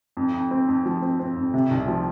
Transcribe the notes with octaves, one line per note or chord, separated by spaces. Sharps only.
F2
F2
C4
F2
F3
C4
C4
F2
C3
C2
F3